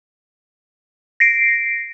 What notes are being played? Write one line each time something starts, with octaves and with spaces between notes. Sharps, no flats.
A#6 C7 D7